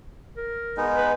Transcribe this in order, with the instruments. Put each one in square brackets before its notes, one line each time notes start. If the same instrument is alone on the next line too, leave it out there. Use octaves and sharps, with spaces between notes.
[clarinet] A#4
[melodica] G#3 B3 D#4
[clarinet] B4